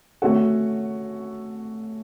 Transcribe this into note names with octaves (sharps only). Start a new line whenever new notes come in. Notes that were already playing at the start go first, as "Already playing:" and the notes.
A3 C#4 F#4 A4 C#5